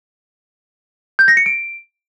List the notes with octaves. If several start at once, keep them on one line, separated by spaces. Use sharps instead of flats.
G6
A#6
C#7
D7